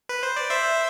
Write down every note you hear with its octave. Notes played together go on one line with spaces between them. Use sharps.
B4
C5
D5
C5 E5